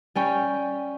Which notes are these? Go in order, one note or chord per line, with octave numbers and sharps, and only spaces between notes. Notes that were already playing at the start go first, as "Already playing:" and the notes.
G3 C#4 G5